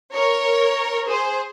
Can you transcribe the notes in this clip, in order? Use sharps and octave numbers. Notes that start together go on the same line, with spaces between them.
A#4 C#5
G#4 C5